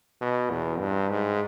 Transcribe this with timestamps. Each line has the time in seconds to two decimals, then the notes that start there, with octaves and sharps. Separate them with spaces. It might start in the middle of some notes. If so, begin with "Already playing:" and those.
0.21 B2
0.51 E2
0.80 G2
1.10 G#2